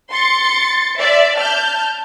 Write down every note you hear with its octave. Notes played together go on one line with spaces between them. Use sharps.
C6 A6 C#7
D5 E5
A5 F6 G6